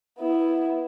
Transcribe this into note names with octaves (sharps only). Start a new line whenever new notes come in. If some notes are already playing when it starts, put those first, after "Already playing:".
B3 E4